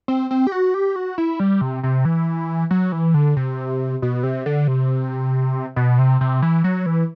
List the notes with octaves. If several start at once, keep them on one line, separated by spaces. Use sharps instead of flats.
C4
C4
G4
F#4
G4
F#4
E4
G3
C3
C3
E3
F#3
E3
D3
C3
B2
C3
D3
C3
B2
C3
C3
E3
F#3
E3